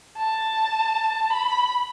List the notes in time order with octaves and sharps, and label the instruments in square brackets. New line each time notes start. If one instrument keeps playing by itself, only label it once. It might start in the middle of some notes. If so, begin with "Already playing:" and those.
[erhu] A5
B5